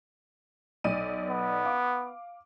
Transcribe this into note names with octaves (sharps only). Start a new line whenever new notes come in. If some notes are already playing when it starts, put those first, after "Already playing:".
B1 D5 D#7
B3
F5 D6